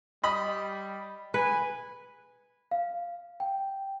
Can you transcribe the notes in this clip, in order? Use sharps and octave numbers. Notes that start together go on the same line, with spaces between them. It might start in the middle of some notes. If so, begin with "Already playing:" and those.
G3 D#5 B5
B4 G#5
F5
G5